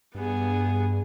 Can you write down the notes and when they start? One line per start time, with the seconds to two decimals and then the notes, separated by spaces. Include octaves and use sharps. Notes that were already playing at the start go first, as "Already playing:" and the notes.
0.15 G2 B3 G#4